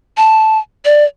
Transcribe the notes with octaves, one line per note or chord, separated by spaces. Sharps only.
A5
D5